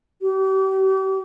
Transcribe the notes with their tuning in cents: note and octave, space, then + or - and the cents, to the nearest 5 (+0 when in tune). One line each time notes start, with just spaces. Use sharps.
G4 -40